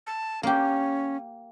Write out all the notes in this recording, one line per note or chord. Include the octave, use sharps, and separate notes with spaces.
A5
A#3 C#4 G4